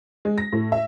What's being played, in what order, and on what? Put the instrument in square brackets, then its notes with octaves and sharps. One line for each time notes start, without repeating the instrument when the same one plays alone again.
[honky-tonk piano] G#3
A#6
A2
E5